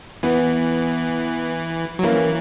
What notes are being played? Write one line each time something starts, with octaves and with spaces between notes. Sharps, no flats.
E3 B3
F#3
E3 A#3 C#4